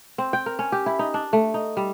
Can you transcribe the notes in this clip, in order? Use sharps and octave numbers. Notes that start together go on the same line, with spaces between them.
C4
G5
A#4
C#4
G4
E4
D#4
D4
A3
D#4
G3